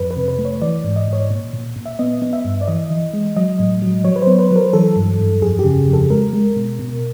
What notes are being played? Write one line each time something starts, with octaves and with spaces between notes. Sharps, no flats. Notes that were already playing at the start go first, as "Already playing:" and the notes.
Already playing: F2 B4
B4
C3
B4
A3
C#5
E3 D5
G#2
D#5
G#2 C#5
A#2
A#2
A#2
E5
B3 D#5
B3
E5
G2
D5
E3 D#5
E3
G#3
F#3 D#5
A2
F#3
F#3 C#5
B4
C5
B3
B4
F#3 A#4
E3 A4
G2
G2
F2 G#4
G4
C#3
F2
A4
G#3 A#4
G#3
B2
B2